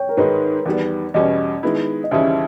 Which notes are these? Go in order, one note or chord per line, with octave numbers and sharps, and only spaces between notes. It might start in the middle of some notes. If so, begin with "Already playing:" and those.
Already playing: C#5 G5
A#4
G#2 D#3 G#3 D#4 B4
E2 D#3 G3 B3
E2 B2 G3 C#4 D#5
D#3 G#3 B3 E4
D#5
D#2 C#3 E3 G3 C#4 E5